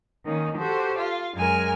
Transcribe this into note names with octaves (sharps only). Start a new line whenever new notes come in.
D#3 A#3 C#4 D#4
F#4 G4 A4 C5
F4 F5
F#2 G#3 A#4 G#5 F6